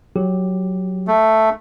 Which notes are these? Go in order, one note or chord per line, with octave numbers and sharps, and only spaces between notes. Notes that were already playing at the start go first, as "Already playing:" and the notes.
F#3 G4
A3